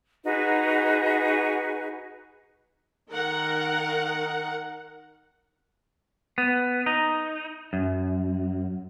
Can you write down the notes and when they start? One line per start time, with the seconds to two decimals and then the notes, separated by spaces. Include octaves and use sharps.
0.25 D#4 F#4 G#4 B4
3.11 D#3 A#4 F#5
6.38 B3
6.86 D#4
7.73 F#2